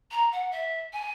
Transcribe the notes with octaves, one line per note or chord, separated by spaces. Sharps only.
A#5
F#5
E5
G#5